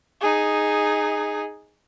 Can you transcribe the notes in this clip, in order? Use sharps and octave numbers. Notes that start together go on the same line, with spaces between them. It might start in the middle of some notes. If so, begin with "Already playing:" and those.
D#4 G#4